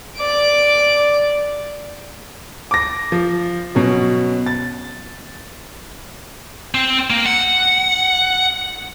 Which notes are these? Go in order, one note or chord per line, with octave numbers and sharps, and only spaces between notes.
D5 D6
D6 A#6
F3
B2 F#3 C#4
A6
C4
A#3
F#5